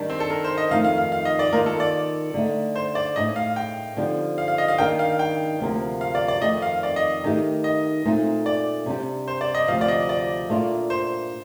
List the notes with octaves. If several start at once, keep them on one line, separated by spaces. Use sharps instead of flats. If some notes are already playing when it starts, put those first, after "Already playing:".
Already playing: D#3 G3 D4 G4
C4
A4
A#4
C5
D#5
F2 D#3 A3 D#4 F5
F5
F5
F5
D#5
D5
D#3 A#3 F4 A#4
A4
D5
D3 A3 D#4
C5
D5
A2 A3 D#4 D#5
F5
G5
D3 F3 C4 D#4 G4
F5
F5
D#5
F5
D#3 A#3 D4 G5
F5
G5
D2 C3 F3 A#3
F5
D5
D5
F2 D#3 A3 C4 D#5
F5
D5
D#5
D#3 A3 D#4 G4
D#5
A#2 A3 C4 D#4
D5
C3 G3 D4 G4
C5
D5
D#5
D2 C3 F3 F5
D5
D#5
D5
A#2 A3 D4 F4
C5